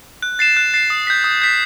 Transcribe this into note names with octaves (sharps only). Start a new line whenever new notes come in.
F#6
A6 C7 E7
F#6
A6 C7 E7
D#6
G6 B6
D#6
G6 B6